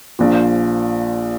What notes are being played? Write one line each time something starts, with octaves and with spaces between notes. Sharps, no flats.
A#1 A#2 F3